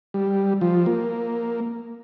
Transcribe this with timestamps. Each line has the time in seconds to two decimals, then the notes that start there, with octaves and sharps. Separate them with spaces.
0.14 G3
0.61 F3
0.86 A#3